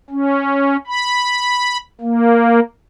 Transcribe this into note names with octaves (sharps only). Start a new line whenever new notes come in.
C#4
B5
A#3